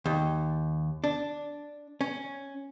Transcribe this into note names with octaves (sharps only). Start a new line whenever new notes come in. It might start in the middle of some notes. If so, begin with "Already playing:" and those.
D#2
D4
C#4